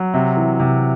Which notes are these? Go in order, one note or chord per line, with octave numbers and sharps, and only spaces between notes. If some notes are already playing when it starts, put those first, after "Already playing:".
Already playing: F#3
C3
E3
C3